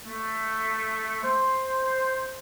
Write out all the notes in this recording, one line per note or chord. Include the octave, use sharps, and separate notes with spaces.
A3
C5